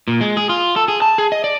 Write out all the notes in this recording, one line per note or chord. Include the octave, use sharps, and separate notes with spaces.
A#2
G#3
G#4
F4
A4
G#4
A5
G#4
D#5
D5